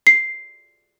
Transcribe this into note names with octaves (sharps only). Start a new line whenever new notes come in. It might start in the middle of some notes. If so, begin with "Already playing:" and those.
C7